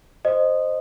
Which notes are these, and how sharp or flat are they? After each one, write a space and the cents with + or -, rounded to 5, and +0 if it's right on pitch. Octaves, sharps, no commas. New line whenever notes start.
C5 +0 D#5 -15